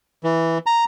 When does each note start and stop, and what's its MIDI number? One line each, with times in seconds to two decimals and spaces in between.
0.24 0.58 52
0.66 0.85 82